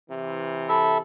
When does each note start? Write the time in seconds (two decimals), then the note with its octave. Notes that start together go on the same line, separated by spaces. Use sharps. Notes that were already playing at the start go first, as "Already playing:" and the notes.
0.10 C3 E3
0.69 A4 E5 B5